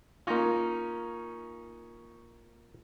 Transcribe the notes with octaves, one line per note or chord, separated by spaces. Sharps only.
A#3 C#4 D#4 F4